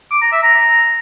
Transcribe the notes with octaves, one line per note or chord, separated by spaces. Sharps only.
D6
A#5
E5
A#5